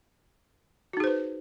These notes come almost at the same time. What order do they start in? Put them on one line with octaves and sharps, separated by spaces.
F#4 D#4 G#4 C5 B4